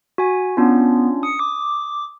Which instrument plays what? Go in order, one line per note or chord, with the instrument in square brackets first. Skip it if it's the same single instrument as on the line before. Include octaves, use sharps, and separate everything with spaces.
[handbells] F#4 G#5
[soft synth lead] B3 [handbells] C#4 D4 F4
[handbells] D#6 [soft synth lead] C#7
[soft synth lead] D6